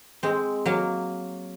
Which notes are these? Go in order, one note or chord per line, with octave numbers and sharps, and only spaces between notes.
G#3 C4
F#3 A#3